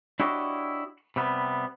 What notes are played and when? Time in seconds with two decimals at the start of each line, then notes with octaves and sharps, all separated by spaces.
0.20 D4 E4 F#4 G4 C#5 D#5
1.16 C3 G3 B3